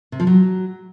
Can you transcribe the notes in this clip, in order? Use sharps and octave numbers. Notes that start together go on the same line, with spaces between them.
C3
F3
F#3